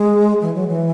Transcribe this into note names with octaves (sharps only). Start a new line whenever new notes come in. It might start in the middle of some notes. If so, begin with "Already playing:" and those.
Already playing: G#3
E3
F#3
E3